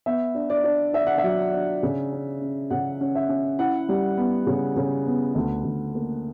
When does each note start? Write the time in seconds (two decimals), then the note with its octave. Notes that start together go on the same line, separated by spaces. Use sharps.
0.06 B3 E5
0.35 D4
0.50 D5
0.64 D4
0.93 D4 E5
1.07 F#5
1.18 E5
1.24 F#3
1.53 D4
1.83 C#3
2.12 C#4
2.41 C#4
2.70 C#3 F#5
3.01 C#4
3.15 E5
3.29 C#4
3.59 E4 F#5
3.89 G3
4.18 B3
4.47 C#3
4.76 C#3
5.06 B3
5.35 D2
5.64 D2
5.95 A#3